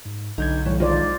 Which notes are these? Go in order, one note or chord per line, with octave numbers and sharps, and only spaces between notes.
G#2
B1 D3 D#4 G6 G#6
A2 E3 G3 C#5
D#3 G#3 D#4 F4 C5 D5